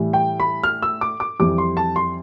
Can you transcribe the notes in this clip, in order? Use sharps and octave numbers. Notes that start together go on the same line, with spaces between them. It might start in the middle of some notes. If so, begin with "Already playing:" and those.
Already playing: A2 E3 G3
G5
B5
F6
E6
D6
D6
F2 E3 G3 D6
C6
A5
C6